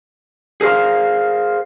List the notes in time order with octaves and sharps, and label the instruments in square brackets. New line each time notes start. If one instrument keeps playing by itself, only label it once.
[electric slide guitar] G#4 A#4 C5 F5